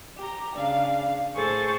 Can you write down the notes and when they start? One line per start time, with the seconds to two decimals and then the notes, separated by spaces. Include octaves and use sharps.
0.19 G4 A#5
0.55 C#3 D4 F5
1.35 A2 G#4 A4 C5 C#6 A6